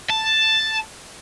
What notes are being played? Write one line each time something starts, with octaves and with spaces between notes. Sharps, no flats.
A5